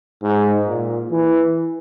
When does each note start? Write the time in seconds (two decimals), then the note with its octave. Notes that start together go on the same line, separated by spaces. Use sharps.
0.22 G#2
0.67 A#2
1.11 E3